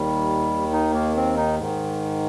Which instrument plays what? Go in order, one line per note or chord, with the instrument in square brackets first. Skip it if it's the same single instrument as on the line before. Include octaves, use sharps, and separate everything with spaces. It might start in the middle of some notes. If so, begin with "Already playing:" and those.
Already playing: [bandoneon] D#2 D#3 G3
D#4
A#3
C4
D#4
G#2 D#3